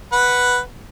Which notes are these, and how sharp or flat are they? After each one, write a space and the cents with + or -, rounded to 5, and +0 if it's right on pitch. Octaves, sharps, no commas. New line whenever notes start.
B4 +0 F#5 +0